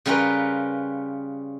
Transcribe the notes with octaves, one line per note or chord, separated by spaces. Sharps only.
C#3 G3 C#4 F4 A#4 B4